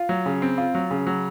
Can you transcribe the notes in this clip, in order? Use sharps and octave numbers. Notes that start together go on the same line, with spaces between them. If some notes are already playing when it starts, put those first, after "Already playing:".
Already playing: F4
F#3
C#3
C4
F4
F#3
C#3
F#3